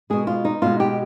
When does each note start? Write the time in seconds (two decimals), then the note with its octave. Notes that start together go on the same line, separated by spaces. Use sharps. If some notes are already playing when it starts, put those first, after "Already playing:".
0.10 B2 G#3 G#4
0.27 F4
0.45 D#4
0.62 B2 G#3 F4
0.80 G4